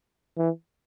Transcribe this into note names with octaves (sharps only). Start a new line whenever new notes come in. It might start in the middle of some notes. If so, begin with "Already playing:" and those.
E3